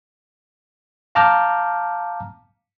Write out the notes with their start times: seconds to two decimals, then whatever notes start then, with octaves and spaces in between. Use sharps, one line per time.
1.15 F5 A5 A#5 D6 F6 G6